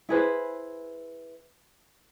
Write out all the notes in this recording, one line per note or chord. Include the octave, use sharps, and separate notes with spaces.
E4 G#4 B4 C5